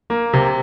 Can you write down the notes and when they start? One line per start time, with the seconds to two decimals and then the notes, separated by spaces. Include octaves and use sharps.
0.10 A#3
0.33 C3